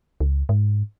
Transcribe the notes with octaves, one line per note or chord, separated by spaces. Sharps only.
C#2
G#2